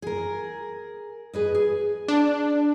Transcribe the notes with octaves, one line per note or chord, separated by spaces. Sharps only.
G#4 A#4
G#4 B4 D#5
G#4
D4